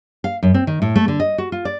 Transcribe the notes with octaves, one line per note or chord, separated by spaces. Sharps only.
F5
F#2
C4
D#3
A2
A3
D3
D#5
F#4
F4
D5